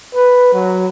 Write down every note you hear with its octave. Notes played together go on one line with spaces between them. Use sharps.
B4
F#3